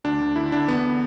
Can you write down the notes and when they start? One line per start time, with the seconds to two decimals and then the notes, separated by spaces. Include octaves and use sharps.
0.04 D2 D4
0.21 D2
0.36 D3 E4
0.52 D3 D4
0.68 E2 B3